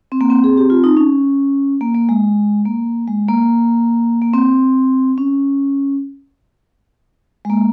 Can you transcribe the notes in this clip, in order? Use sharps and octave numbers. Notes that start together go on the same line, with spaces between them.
C4
A#3
C4
G#4
G4
F4
D#4
C#4
A#3
A#3
G#3
A#3
G#3
A#3
A#3
C4
C#4
G#3
A#3